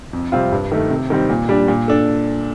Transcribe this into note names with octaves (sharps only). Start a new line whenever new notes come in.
F2
C3 G3 C4 F4
G2
D#3 A3
C3
D#3 G3 C4
A#2
G3 D4
A#2
D4 A4